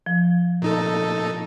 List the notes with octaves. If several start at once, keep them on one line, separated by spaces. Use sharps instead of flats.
F3
A#2 D#4 A4